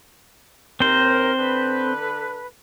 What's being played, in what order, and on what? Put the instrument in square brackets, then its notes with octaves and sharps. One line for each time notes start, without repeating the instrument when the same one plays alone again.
[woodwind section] D#2 A#4 [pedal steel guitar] C4 C5
[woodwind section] D3 A4 B4